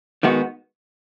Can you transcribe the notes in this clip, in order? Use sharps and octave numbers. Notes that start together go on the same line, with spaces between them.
D#3 G#3 B3 F#4